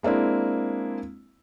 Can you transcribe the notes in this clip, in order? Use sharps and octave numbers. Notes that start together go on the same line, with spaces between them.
G#3 A#3 C4 D4 E4